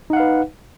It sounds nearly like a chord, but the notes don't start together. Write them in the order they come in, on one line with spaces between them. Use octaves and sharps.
D#4 F#5 F5 B4